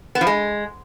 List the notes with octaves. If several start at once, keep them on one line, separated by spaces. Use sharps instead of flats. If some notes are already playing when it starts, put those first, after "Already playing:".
B3
F3
G#3